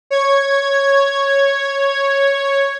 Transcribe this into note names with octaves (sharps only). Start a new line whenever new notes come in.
C#5 G#6